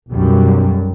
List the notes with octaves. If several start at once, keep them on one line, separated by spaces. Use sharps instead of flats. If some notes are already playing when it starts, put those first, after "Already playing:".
B1 F#2 G3